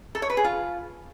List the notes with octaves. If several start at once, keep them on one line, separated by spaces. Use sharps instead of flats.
A4
C#5
B4
G#4
F4